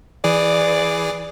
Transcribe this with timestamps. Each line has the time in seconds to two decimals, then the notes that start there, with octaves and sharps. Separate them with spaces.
0.24 E3 G#4 D5